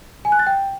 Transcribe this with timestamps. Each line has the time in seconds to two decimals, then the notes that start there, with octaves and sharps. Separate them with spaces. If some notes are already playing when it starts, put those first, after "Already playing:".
0.25 G#5
0.32 F#6
0.39 A6
0.47 G5